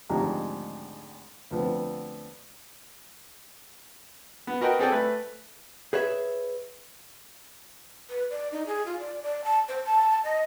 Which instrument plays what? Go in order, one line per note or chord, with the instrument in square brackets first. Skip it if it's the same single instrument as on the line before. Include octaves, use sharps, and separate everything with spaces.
[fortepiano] G#1 D2 G#2 F3 G4 A#5
D2 F3 B3 C4
B3
F#4 A#4 B4 D#5 G5
C4 G#4 A4 D5 G5 G#5
A3 B4
[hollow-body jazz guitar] G#4 B4 C#5 E5
[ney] B4
D5
D#4
G#4
F4
D5
D5
A5
C5
A5
D#5